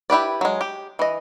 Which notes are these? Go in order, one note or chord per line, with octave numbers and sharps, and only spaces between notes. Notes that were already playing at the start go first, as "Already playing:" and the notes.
E4 G4 B4 D5
F#3 G#3
G4
E3 D#5